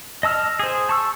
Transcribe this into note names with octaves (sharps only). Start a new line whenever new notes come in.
D#5 A5 E6 F6
G#4 C5
A5 C#6 E6